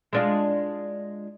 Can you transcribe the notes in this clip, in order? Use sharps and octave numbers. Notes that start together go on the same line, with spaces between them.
G#3 D4 F4